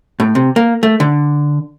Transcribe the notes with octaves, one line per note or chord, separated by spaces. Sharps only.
A2
C3
A#3
A3
D3